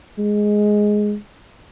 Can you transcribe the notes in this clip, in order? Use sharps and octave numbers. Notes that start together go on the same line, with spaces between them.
G#3